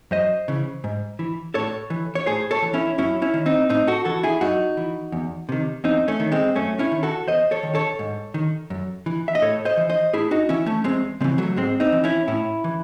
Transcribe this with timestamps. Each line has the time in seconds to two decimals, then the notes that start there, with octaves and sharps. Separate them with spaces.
0.11 F#2 C5 D#5
0.48 C#3 E3
0.84 G#2
1.19 E3
1.54 A2 A4 C#5
1.90 E3
2.15 C#5
2.26 A2 G#4 C5
2.51 A4 C#5
2.62 E3
2.74 C#4 E4
2.98 F#2 C#4 E4
3.22 C#4 E4
3.34 D#3
3.46 C4 D#4
3.69 A2 C4 D#4
3.88 F#4 A4
4.05 E3 F#4 A4
4.23 E4 G#4
4.41 F#2 D#4 F#4
4.77 E3
5.12 E2
5.49 C3 D#3
5.84 E2 C4 D#4
6.08 A3 C#4
6.20 D#3
6.32 G#3 C4
6.56 F#2 A3 C#4
6.79 C#4 E4
6.92 D#3
7.03 F#4 A4
7.27 E2 C5 D#5
7.51 A4 C#5
7.63 D#3
7.75 A4 C#5
7.99 G#2
8.34 D#3
8.70 F#2
9.06 E3
9.28 E5
9.35 D#5
9.42 A2 A4 C#5
9.65 C5 D#5
9.77 E3
9.89 C5 D#5
10.13 A2 E4 G#4
10.31 D#4 F#4
10.49 E3 C#4 E4
10.66 A3 C#4
10.84 E2 G#3 C4
11.21 C#3 G#3 C4
11.24 E3
11.38 F#3 A3
11.56 G#2 G#3 C4
11.80 C4 D#4
11.92 E3
12.04 C#4 E4
12.28 A2 C#4 E4
12.64 E3